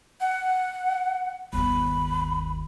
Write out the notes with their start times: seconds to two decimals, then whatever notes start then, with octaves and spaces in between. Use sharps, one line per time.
0.21 F#5
1.53 G1 D#2 B5